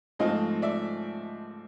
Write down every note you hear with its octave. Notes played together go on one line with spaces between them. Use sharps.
G#2 F3 A3 C4 D#5 F5
D5 E5